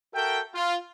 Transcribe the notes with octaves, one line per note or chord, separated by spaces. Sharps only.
F#4 A4 A#4 E5 G5
F4